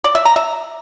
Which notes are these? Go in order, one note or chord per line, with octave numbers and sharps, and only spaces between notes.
D5
E5
A#5
E5